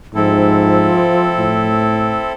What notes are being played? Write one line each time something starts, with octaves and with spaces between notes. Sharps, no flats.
G#2 F3 C4 E4 A4
A2